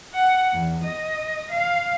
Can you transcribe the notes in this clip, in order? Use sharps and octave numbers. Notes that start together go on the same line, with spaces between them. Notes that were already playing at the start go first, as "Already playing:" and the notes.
F#5
E2
D#5
F5